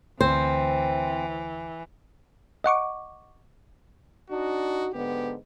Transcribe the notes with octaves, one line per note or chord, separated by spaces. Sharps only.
D2 E3 C4 C5
D#5 F#5 C#6 D6
D4 D#4 F#4
G#2 D3 B3 G4